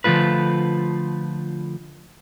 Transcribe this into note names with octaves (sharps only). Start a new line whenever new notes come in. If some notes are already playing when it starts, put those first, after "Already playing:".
D3 F3 A3 F4 B4